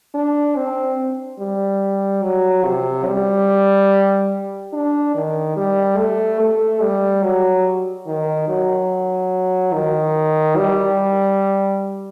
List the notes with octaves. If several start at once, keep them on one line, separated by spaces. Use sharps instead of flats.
D4
C4
G3
F#3
C3
G3
D4
D#3
G3
A3
A3
G3
F#3
D#3
F#3
D#3
G3